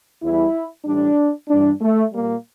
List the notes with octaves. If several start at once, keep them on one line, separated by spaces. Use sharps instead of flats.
E2 E3 G3 E4
A2 E3 G3 D4
G2 E3 G3 D4
A3
A#2 G3 A#3